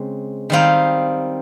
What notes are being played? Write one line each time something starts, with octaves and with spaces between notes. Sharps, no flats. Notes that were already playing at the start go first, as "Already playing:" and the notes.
Already playing: C#3 G#3 C4
D#3 G3 C4 D#4 F5